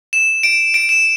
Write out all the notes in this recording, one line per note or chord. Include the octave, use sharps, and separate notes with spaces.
E7
D7
D7
E7